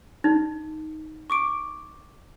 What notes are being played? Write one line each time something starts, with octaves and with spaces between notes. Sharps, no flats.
D#4
C#6 D6 D7